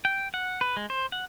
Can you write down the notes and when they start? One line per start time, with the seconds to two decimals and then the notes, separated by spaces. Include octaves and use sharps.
0.05 G5
0.34 F#5
0.61 B4
0.77 G#3
0.90 C5
1.12 F#5